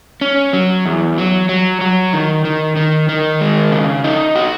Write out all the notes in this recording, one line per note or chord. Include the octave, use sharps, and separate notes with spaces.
C#4
F#3
E2
F#3
F#3
F#3
D#3
D#3
D#3
D#3
G#3
C#3
D#4
F#4